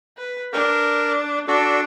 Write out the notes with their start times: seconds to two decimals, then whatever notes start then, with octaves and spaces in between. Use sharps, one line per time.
0.17 B4
0.53 D4 A#4
1.48 D4 F#4 A4